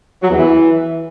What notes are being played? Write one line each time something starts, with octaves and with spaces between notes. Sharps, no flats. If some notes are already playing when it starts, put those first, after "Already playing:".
F#3
E2
E3